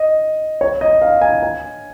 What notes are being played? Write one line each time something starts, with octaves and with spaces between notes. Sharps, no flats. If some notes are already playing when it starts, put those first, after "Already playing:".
Already playing: D#5
C#5
D#5
F5
G#5
G#5